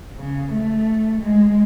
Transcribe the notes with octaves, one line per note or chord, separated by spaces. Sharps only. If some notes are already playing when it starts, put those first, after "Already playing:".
C#3
A3
G#3